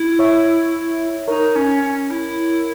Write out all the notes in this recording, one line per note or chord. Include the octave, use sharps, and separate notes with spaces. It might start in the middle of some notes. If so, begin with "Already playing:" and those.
Already playing: E4
C#5 E5
D#4 A#4 C#5
C#4
C#4
E4